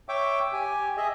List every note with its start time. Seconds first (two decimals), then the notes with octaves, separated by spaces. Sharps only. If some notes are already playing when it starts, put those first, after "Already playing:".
0.09 C#5 E5 G5 D6
0.53 G4 G#5
0.97 G#4 D#5 E5